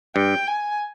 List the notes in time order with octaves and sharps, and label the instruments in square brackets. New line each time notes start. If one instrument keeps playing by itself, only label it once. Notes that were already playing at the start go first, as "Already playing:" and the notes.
[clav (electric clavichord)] G2 [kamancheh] G5
[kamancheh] G#5